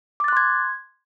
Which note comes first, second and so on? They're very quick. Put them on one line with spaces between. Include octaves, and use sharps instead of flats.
D6 A6 F#6 C6 G#6